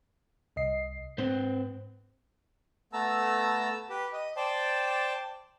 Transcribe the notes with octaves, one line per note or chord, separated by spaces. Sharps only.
C2 D#5 C7
G#2 C4 B4 C5
A3 B3 A5 A#5 E6
G4 B4
D#5
C5 D5 G5 A5